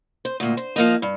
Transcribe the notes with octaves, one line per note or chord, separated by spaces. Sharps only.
C5
D2 A#2
C5
F3 A#3 D#4
G2